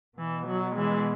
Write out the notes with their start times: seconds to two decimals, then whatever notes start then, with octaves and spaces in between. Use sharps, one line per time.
0.18 B2 E3
0.47 F#3
0.76 E3 G#3